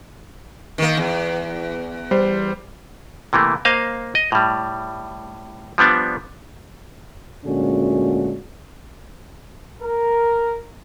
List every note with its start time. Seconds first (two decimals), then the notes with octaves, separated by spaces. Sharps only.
0.78 D#3 A#3
0.97 E2
2.11 G3 C5
3.33 C3 E3 A3 A#3
3.65 A#3 C5 D#5 F5
4.15 D#5
4.32 A2 G3
5.78 F3 G3 B3 D4
7.45 D2 A#2 D3 G#3 C#4 F#4
9.82 A#4